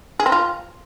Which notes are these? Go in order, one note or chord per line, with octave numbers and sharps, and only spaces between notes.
G#4
C4
F4